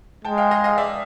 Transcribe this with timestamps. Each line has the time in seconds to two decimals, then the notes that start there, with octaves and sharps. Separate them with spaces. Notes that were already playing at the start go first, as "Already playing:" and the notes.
0.25 G#3 G5 A5
0.38 F5 G5
0.51 D#5 F5
0.64 D#5 F5
0.78 D5 E5